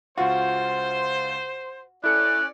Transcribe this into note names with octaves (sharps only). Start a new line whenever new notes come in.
C#2 F4 F#4 C5
C#4 E4 A4 D5 F#6 C#7